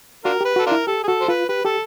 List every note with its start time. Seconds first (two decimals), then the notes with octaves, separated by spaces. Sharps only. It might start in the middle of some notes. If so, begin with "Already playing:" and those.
0.25 D4 F4 F#4 A#4
0.41 G4 B4
0.56 F#4 A4
0.67 D4 F4 A#4
0.72 E4
0.87 G4 A4
1.04 G#4
1.08 F#4 A4
1.21 C5
1.28 F4 B4
1.49 G4 B4
1.65 G4 A4